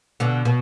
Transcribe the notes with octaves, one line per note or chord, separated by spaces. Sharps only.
B2 D3
B2